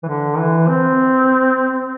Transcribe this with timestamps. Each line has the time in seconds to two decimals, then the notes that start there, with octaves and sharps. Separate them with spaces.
0.03 E3
0.08 D3
0.38 E3
0.68 C4